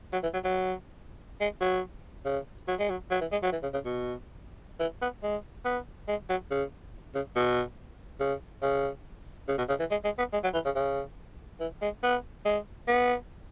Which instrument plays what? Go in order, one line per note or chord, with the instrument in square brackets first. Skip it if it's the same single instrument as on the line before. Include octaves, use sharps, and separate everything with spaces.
[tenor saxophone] F#3
E3
F#3
F#3
G#3
F#3
C#3
F#3
G#3
F#3
F#3
E3
G#3
F#3
E3
C#3
C#3
B2
E3
B3
G#3
B3
G#3
F#3
C#3
C#3
B2
C#3
C#3
C#3
B2
C#3
E3
G#3
G#3
B3
G#3
F#3
E3
C#3
C#3
E3
G#3
B3
G#3
B3